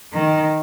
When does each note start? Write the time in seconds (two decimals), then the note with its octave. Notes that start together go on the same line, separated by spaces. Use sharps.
0.13 D#3